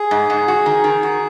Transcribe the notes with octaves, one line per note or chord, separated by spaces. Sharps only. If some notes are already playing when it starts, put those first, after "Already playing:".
Already playing: G#4
G#2
G#2
F#4
D#3
D#3
F#4